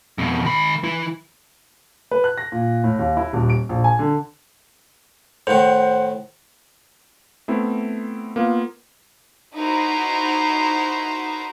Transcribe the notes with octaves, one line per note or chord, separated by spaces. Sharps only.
F2 B2
D#3 B5
E3 E4
B4
F#6
A#6
A#2
A2
D#2
E4
D#1
D7
A#1
G#5
D3
A2 D#3 C5 F#5
A3 B3 C4 E4
A#3 B3 F4
D#4 E4 F#4 A#4 C5 A#5